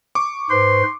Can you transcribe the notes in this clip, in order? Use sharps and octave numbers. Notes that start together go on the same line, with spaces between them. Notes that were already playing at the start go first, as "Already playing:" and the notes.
C#6 D6
G#2 B4 C5 C6